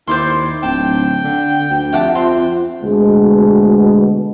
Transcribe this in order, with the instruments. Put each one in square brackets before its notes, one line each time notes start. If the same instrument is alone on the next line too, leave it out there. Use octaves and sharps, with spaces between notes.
[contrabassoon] D#2 [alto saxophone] E4 [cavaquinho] C5 D5 C6
[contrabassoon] D1 [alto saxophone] G5 [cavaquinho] A5
[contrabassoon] D3
D2
[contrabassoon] F2 [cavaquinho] G4 F#5 A5 [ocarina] E5
[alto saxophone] C4 [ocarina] F4 [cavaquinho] C6
[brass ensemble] D2 B2 G#3